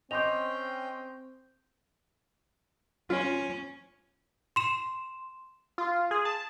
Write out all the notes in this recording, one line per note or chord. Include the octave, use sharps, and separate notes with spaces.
C4 C#4 D#5 G5 C6 D6 G6 F7
C#4 F4
C6 E7
F4
G#4
A5